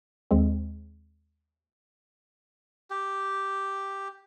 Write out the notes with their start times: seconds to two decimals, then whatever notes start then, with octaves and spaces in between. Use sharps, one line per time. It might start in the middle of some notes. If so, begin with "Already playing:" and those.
0.31 D#2 G#3 C4
2.90 G4